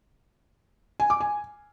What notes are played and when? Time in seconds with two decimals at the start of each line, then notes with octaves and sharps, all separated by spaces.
1.00 G#5
1.10 D6
1.20 G#5